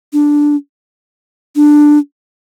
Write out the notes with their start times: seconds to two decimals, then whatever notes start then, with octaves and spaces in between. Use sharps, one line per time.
0.13 D4
1.55 D4